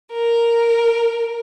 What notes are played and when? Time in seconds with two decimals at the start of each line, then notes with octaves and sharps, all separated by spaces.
0.12 A#4